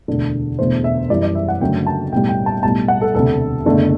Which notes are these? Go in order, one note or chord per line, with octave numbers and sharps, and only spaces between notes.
E1 D2 D3
E1 E2 D3 A3 C5
E5
F#2 E3 G3 D5
D5
E5
F#5
F#1 F#2 D3 F#3 A3 G5
A5
B1 A2 G3 G5
G5
A5
B1 A2 G3 A5
F#5
A4
E1 D2 C3 A4
F#1 E2 D3 A3